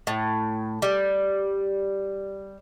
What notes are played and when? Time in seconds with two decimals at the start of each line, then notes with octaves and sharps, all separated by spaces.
0.07 A2
0.82 G3